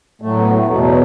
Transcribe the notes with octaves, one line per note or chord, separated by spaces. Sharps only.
A2 F#3 A3
B3
A3
E2 B2 F#3 B3
B3